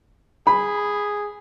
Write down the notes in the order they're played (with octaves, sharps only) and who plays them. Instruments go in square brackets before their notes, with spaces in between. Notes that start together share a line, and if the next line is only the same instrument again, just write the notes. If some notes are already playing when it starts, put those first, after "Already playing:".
[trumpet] G#4 [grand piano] B5